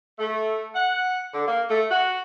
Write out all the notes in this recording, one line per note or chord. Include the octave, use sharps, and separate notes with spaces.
A3
F#5
D3
A#3
A3
F#4